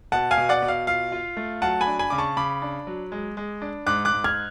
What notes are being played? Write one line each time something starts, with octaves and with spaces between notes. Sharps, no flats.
B2 F#5 A5
F5 G#5
B2
D5 F#5
B2
F5
F4 F5
F4
A3
F#3 F#5 A5
G#5 B5
D4
G#5 B5
C#3 D6
A5 C#6
C#3 B5 D6
D4
F#3
G#3
G#3
D4
G#2 D6 F#6
D6 F#6
G#2
F6 G#6